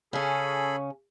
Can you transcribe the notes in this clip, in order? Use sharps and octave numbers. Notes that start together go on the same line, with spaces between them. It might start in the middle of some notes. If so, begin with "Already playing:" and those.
C#3 C#4 G#4 A4 B5